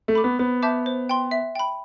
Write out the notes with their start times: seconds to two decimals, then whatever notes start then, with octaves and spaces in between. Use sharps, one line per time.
0.08 A3
0.15 B5 D6
0.24 B3
0.39 B3 C5
0.62 E5 A5 D6 G6
0.86 C5
1.09 G5 C6
1.31 E5
1.55 G5 B5